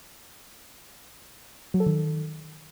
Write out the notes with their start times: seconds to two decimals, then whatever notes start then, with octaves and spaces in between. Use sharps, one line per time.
1.74 F#3
1.80 A4
1.86 D#3